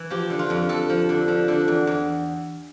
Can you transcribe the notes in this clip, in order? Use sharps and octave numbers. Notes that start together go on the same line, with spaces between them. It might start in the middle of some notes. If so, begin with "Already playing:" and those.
Already playing: E3
F3 G4
D3
F4
F2
F2 A4
F3
D3
F3
D3
E2
E2